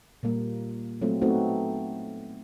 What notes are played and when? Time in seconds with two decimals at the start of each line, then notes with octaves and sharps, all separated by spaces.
0.23 A#2 G3 A#3
1.02 F#3 A3 C4 F4
1.21 A3 B3 C4 D#4 F#4